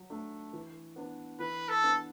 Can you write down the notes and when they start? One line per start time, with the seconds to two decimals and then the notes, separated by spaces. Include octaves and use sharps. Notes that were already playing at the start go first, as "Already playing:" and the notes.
Already playing: F#3
0.10 A3 D4
0.53 E3
0.96 B3 D4
1.39 E3 B4
1.69 A4
1.83 B3 D4